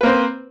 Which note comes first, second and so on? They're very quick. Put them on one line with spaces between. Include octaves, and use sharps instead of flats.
B4 A#3 C4 C5